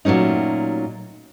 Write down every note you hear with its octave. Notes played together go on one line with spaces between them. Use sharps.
A#2 F#3 A3 C#4 D#4